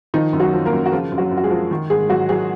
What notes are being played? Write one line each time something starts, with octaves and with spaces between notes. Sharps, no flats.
D#3 F3 D#4
F#2
F#3 F#4
F3
A#3 A#4
F#2
F#4
C#3 F3 F4
F#2
F#3 F#4
F#2
F#4
G#3 G#4
F3
D#3
G#2 G#3 G#4
G#2 F#3 F#4
F#3 G#3 G#4